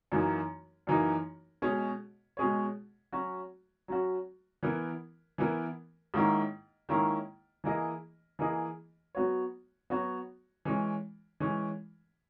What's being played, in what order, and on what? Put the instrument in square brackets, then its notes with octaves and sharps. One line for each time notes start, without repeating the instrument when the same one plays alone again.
[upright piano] F#2 E3 A#3 D#4
F#2 E3 A#3 D#4
B2 G#3 C#4 G#4 C#5
B2 G#3 C#4 G#4 C#5
F#3 C#4 F#4
F#3 C#4 F#4
E3 B3 E4 A#4
E3 B3 E4 A#4
G#2 D#3 A#3 C#4 E4
G#2 D#3 A#3 C#4 E4
E3 A#3 E4 G#4 D#5
E3 A#3 E4 G#4 D#5
F#3 B3 F#4 C#5
F#3 B3 F#4 C#5
E3 G#3 C#4
E3 G#3 C#4